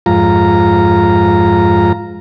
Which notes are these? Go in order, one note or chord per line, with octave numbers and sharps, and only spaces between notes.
F2 G#2 F4 A#5